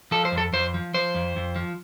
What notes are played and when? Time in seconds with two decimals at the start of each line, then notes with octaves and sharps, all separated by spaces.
0.11 F3 A4
0.25 C5
0.32 F2
0.38 A4
0.53 F2 C5
0.74 F3
0.94 F3 C5
1.15 F2
1.36 F2
1.56 F3